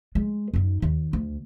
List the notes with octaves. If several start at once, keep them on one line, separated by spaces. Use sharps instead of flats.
G#3
F#2 D#4
D#2
D2